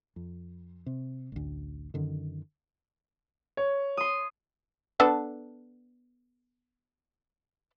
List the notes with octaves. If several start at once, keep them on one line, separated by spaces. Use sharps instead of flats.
F2
C3
A1 D2
F#2 D3 D#3
C#5
C6 D#6
B3 D4 A4